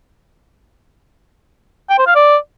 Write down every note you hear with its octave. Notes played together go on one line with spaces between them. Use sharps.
G5
C5
F5
D5